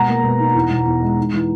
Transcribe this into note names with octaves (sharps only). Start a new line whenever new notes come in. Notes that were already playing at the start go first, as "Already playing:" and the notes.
Already playing: B2 G#3 F#5 A#5
A#3
B2
D#4
E2
B2
E2
G#3
D#4
E3